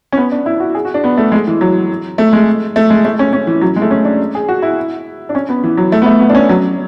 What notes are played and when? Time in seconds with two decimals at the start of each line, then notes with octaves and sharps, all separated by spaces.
0.12 C#4
0.17 B3
0.32 D4
0.46 E4
0.60 F#4
0.75 G#4
0.85 F#4
0.94 D4
1.04 B3
1.17 A3
1.32 G#3
1.47 E3
1.61 F#3
2.18 A3
2.33 G#3
2.76 A3
2.90 G#3
3.05 A3
3.19 C#4
3.33 C#4
3.47 E3
3.61 F#3
3.76 G#3
3.82 A3
3.91 C#4
4.05 D4
4.35 G#4
4.48 F#4
4.62 E4
5.29 D4
5.35 C#4
5.49 B3
5.64 E3
5.77 F#3
5.92 A3
6.02 B3
6.06 A3
6.20 B3
6.29 D4
6.35 C#4
6.49 F#3